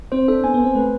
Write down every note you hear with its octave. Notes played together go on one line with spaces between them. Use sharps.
C4 C5
D4 A4
B3 G#5
B3
C5
C4
A3 B4